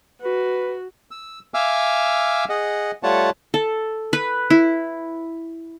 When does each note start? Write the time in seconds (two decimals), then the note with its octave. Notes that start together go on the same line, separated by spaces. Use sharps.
0.22 F#4 B4
1.11 E6
1.54 E5 F5 G#5 D6 E6 F6
2.49 G#4 D#5 F#5
3.03 G3 A3 F4 C#5 F#5 A5
3.54 A4
4.13 B4
4.50 E4